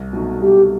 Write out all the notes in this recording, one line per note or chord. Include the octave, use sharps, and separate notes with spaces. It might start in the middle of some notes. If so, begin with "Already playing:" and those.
Already playing: C2
B2 F#3 A3 D#4
C2 G4